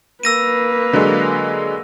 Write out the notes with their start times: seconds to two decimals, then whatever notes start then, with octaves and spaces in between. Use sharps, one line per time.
0.23 A#3 B4 E6 A#6 D#7
0.93 D3 F#3 G#3